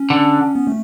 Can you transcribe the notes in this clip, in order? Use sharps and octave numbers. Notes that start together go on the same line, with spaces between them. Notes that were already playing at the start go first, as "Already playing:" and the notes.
Already playing: C#4
D3
B3
A3